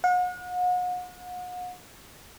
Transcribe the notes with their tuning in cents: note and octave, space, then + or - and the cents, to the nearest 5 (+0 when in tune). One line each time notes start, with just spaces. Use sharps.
F#5 -40